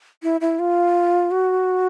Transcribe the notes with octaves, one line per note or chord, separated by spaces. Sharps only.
E4
E4
F4
F#4